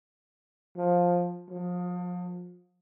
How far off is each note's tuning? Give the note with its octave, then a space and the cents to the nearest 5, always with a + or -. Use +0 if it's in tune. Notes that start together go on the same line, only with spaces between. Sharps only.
F3 +15
F3 +35